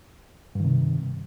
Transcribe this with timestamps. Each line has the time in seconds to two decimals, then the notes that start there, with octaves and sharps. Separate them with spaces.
0.55 G2
0.60 D#3
0.65 C3